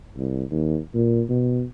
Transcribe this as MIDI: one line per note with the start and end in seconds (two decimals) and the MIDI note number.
0.17 0.43 36
0.51 0.78 39
0.94 1.23 46
1.29 1.64 47